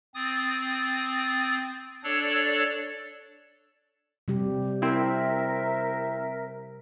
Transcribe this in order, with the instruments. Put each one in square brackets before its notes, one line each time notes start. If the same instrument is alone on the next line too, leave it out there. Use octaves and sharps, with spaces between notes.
[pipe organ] C4 D#6 A6
D4 A4 C#5 D5
[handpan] C3 G3 G4
[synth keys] C4 E4 [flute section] A#4 E5